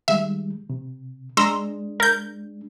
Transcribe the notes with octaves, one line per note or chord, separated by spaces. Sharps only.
D#3 G3 G#3 E5
C3
G#3 D4 A#5 C6 E6
A#4 G6